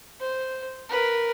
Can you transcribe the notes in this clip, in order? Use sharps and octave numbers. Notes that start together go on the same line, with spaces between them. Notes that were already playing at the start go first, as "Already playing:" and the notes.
C5
A#4 B4